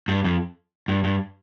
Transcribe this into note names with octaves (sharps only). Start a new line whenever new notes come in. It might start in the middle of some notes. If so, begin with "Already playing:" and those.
G2
F2
G2
G2